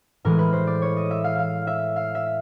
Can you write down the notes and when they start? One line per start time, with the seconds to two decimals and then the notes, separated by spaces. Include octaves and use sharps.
0.25 A2 E3 G#3 A#4
0.39 B4
0.53 C5
0.67 D5
0.82 C#5
0.97 D#5
1.11 E5
1.24 F5
1.39 F5
1.67 E5
1.96 F5
2.15 E5